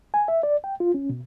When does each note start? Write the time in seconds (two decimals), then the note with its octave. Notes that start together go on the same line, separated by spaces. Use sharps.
0.14 G#5
0.28 E5
0.43 D5
0.64 G5
0.80 F4
0.94 C#4
1.09 B2